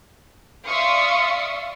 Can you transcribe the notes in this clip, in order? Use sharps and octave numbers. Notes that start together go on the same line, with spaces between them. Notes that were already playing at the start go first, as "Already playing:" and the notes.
D5 E5 F5 C6 C#6 D#6